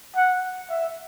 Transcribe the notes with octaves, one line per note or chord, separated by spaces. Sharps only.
F#5
E5